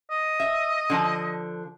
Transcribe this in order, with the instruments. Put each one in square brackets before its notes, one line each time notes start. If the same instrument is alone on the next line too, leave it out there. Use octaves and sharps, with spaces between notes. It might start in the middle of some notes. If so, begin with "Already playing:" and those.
[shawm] D#5
[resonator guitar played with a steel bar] E5
D3 F3 A5